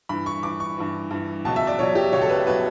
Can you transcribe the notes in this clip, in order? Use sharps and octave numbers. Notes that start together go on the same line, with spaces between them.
G2 E3 B5
C#6
G2 E3 D6
C#6
G2 E3
G2 E3
C#2 B2 F#3 A5
E5
D5
C#2 B2 F#3 C#5
G4
C#2 B2 F#3 C#5
A4
B4
B2 F#3 B4